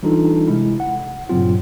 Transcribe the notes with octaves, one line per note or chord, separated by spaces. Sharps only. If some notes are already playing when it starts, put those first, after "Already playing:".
E3 G3 D4 D#4 F4 A4
C3 G#3 E4
F#5
G2 A#2 C#3 F#3 C4 F4